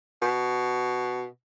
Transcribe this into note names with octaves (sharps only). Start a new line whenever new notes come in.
B2